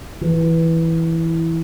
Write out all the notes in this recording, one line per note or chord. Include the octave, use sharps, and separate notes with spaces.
E3